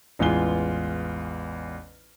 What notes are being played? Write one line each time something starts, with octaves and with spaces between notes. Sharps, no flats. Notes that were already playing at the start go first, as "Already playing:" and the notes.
A1 E2 G#3 F4 G#5 G7